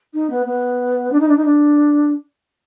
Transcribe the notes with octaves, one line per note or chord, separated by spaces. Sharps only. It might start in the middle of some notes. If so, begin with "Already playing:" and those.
D#4
B3
B3
D4
D#4
D4
D#4
D4